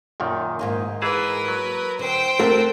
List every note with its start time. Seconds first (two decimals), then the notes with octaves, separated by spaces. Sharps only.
0.20 F#2 A#2 D#3
0.59 G#2 A#3 D#4
1.02 E3 G#4 A#4 B4 A5
1.48 F#3
1.99 D3 C5 G5
2.39 A3 C4 A#4 F#5